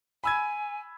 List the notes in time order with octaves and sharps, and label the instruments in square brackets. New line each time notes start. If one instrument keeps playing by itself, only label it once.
[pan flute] G#5 [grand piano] B5 E6 G#6